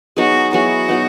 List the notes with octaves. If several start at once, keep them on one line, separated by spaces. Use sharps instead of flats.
F#3 B3 D#4 F#4 G#4
F#3 B3 E4 F#4 G#4
B2 F#3 B3 D#4